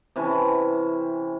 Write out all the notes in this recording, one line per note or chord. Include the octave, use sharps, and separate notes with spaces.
C3 E3 C#4 A5